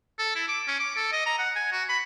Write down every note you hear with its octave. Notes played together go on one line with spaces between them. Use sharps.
A4
E4
D6
C#4
D6
A4
D#5
A#5
F#5
G#5
F#4
B5